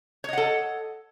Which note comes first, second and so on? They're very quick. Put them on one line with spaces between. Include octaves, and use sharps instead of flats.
C#5 D#5 F#5 A4